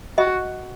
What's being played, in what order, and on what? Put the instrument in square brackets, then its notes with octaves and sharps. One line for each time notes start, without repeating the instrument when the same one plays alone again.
[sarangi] F#4 [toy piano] D#5